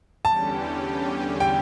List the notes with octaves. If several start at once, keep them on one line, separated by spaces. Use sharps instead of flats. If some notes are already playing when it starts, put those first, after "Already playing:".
E2 D3 G3 C#4 G4 A5
G5